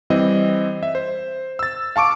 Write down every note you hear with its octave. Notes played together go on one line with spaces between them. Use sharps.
E3 G3 C4 D#5
E5
C5
E6 A6
F5 A5 C#6 D6 D7